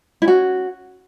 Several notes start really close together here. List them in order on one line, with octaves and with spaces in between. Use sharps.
E4 C#4 F#4